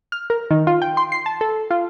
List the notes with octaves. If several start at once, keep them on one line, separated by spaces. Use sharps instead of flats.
F6
A#4
D#3
F4
G5
C6
C7
A5
A4
F4